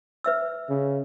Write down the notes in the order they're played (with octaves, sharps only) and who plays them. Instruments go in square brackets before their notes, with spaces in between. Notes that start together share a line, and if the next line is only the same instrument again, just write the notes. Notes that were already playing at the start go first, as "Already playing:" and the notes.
[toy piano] B4 E5 E6
[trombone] C#3